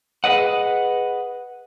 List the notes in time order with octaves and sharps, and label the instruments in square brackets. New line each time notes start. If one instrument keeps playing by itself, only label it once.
[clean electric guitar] G#4 A4 B4 D#5 F#5